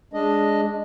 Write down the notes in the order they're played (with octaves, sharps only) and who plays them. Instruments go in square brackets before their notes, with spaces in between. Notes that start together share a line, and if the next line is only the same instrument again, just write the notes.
[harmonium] G#3 D4 D#5